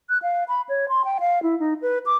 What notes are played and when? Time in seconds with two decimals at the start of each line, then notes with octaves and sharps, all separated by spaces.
0.09 F#6
0.22 F5
0.48 B5
0.69 C#5
0.89 C6
1.05 G5
1.20 F5
1.43 E4
1.60 D#4
1.82 B4
2.06 D6